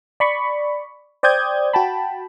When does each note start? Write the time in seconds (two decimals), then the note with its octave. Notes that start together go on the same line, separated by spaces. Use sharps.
0.20 D5 B5 C#6
1.23 C5 D5 G5 D#6 G6 G#6
1.73 F#4 G5 A5 B5